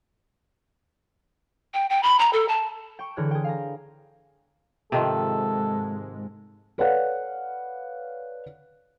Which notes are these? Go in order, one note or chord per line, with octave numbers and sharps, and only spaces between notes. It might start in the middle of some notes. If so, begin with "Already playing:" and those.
G5
G5
B5
A#5
A4
A5
G5 C#6
D3 E3 G#4 C#5 F6 F#6
G#4 G5
F5 G#5 A#5
G#2 C3 D#3 F3 G#3 A4
A4 B4 C#5 D5 F5 F#5